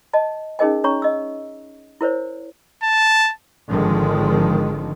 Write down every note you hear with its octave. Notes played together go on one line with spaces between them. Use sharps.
D#5 A5
C#4 D#4 G#4 A#4 D#5 G#5
C#4 C#5 A#5 C#6
D#5 E6
E4 A#4 C5 C#5
A5
G#1 D3 D#3 F3 G#3